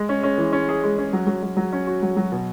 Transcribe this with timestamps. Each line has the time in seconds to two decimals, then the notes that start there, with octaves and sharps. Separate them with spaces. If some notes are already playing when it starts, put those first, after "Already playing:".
Already playing: G#3
0.09 C#4
0.23 C#4
0.38 E3
0.53 C#4
0.69 G#4
0.83 G#3
0.98 C#4
1.13 F#3
1.27 F#3
1.43 F#3
1.57 F#3
1.73 C#4
1.87 F#4
2.02 F#3
2.16 F#3
2.32 B2